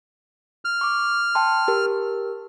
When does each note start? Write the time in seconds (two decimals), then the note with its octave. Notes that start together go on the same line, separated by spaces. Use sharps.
0.65 F6
0.81 C#6 D6
1.35 G5 A5 C6
1.68 G4 A#4